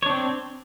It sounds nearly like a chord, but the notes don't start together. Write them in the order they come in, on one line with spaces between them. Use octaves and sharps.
C#5 D4 C4